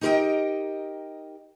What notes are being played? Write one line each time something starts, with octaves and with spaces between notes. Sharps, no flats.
D#4 G4 A#4 B4 D#5 G5